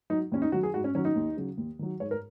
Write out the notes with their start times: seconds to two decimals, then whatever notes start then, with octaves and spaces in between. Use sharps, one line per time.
0.10 F#3 D#4
0.32 D#2 C#4
0.42 D#4
0.52 D#3 F#3 F#4
0.63 G#4
0.74 G#2 F#4
0.84 C#4
0.95 D#3 F#3 C#4
1.05 D#4
1.16 D#2
1.37 C#3 F#3
1.57 D#2
1.79 D#3 F#3
2.00 G#2 C#5
2.11 A#4